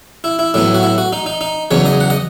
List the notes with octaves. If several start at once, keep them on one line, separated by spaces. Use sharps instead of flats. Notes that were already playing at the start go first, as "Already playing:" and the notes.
E4
E4
A2 F#3 B3 E4
F#4
E4
F#4
D#4
D#4
D#4
E2 C#3 F#3 B3 C#5
D#5
F#5
D#5